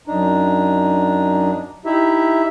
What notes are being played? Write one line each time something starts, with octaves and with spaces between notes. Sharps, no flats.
F#2 D4 D#4
D#4 E4 G4 E5